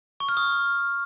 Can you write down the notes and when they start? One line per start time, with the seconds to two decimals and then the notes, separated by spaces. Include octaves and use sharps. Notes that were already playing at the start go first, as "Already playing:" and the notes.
0.20 C#6
0.29 F6
0.37 D#6